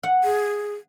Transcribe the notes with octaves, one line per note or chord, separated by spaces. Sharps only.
F#5
G#4